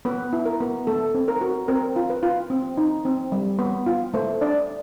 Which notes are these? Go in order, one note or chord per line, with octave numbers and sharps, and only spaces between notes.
B3 B4
E4
A#4
B3
A3 A4
C4
A#4
F#4
C4 A#4
F4
B4
F4
C4
D#4
C4
G3
B3
F4
A3 C5
D4 D5